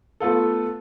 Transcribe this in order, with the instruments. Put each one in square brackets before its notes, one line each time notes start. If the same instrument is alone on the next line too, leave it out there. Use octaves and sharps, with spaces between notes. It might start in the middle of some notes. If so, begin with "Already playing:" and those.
[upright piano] A3 B3 F4 A4